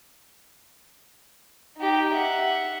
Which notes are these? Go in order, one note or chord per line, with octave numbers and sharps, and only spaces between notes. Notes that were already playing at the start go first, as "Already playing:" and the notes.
D#4 G4
E5 F#5